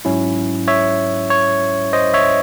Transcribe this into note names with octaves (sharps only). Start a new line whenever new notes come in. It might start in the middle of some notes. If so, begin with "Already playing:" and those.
G#2 F#3 C#4 E4
C#5 E5
C#5
C5 D#5
C#5 E5